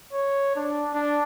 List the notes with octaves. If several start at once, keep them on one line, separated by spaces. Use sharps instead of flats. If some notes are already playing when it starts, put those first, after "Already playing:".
C#5
D4
D4